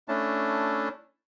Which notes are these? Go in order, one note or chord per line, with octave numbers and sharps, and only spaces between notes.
A3 C#4 D4 E4 A5